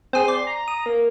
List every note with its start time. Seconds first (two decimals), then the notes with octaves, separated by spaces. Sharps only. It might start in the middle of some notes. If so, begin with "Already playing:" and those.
0.13 C4 G#4 C6
0.28 D5
0.47 A#5
0.68 D#6
0.86 A#3